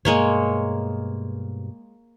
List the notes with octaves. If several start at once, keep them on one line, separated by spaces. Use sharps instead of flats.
G2 B2 G#3 A#3 C#5